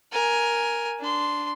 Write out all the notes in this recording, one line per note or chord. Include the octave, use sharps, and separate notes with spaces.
A#4 G#5
D4 C6